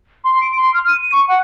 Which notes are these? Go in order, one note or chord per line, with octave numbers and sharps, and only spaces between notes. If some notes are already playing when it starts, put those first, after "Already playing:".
C6
D7
C6
F6
D#7
D#7
C#6
F#5